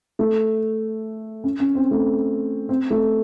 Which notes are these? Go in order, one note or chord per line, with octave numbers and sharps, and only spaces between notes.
A3
C#4
C#4
C4
A3
C4
A3